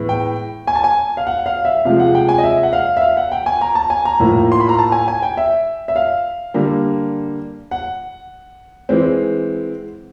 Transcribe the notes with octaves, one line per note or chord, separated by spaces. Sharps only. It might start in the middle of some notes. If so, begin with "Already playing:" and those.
Already playing: A2 E3 G#3 B3
G5
G#5
A5
G#5
F5
F#5
F5
E5
C3 F3 G#3 F5
F#5
G5
G#5
D#5
E5
F#5
F5
E5
F5
F#5
G5
G#5
A#5
A5
G#5
A#5
A2 F3 A#3
C6
B5
A#5
A5
G#5
G#5
G5
E5
E5
F5
D3 G3 A#3
F#5
E3 G#3 C4